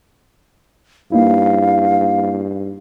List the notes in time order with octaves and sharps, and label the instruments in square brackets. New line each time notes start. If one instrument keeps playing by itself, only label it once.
[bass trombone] G2 [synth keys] A#3 D#4 E4 [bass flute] F5